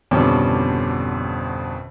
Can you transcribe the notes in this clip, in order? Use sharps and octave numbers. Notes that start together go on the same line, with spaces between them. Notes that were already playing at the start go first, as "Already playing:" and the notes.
G#1 F2 B2 D3 G3 C#4